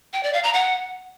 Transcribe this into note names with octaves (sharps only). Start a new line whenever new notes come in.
G5
D5
F5
A#5
F#5